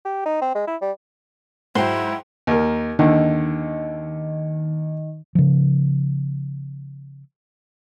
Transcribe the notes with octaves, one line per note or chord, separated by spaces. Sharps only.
G4
D#4
C4
G#3
E4
G3
G#2 F#3 E4 C5 F#5 G5
D#2 A#4
D#2 D3 D#3
C#3 F3